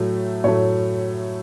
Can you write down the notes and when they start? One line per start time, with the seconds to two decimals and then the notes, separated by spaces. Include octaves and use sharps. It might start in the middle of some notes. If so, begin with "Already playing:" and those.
Already playing: A2 F#3 A3
0.44 A2 F#3 A3 C#5